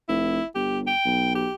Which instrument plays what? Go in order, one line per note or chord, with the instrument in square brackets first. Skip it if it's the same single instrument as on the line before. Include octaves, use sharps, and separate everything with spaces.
[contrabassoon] F1 [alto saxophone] E4
[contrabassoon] G1 [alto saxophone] G4
[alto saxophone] G5
[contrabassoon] B1
[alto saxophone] G4